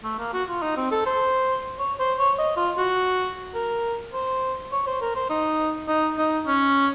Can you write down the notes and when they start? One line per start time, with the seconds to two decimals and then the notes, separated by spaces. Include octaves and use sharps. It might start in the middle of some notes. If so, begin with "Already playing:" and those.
0.04 A3
0.19 A#3
0.33 F#4
0.49 F4
0.62 D#4
0.77 C4
0.91 A4
1.06 C5
1.79 C#5
1.99 C5
2.18 C#5
2.38 D#5
2.57 F4
2.77 F#4
3.55 A#4
4.13 C5
4.72 C#5
4.87 C5
5.01 A#4
5.15 C5
5.30 D#4
5.88 D#4
6.18 D#4
6.47 C#4